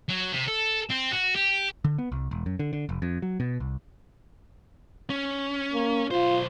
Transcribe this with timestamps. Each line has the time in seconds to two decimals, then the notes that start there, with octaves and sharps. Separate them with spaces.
0.09 F#3
0.33 C3
0.48 A4
0.90 C4
1.11 F#4
1.35 G4
1.84 D3
1.98 B3
2.12 C2
2.31 E1
2.46 F#2
2.59 D3
2.73 D3
2.89 F1
3.02 F2
3.22 F#3
3.40 B2
3.60 C2
5.10 C#4
5.73 A#3
6.11 B1 F4 C5